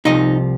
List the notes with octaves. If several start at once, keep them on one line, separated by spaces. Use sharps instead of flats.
C2 C3 F3 D#4 D#5